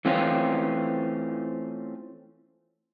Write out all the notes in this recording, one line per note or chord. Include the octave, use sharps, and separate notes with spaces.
E3 A3 C4 C#4 F4